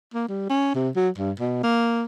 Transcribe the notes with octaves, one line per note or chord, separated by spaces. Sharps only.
A#3
G3
C#4
C3
F#3
G2
B2
A#3